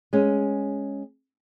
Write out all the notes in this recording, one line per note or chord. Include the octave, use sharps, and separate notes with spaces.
G#3 C#4